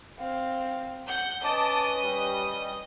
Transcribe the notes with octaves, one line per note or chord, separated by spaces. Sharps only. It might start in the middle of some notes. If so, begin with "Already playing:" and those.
C4 F5
F#5 G6
C#4 B4 D#5 A5 D6
G3